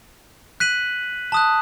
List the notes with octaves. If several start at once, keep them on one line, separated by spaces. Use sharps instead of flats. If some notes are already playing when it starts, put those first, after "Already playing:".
F#6 B6 D#7 F#7
A5 D#6 F#6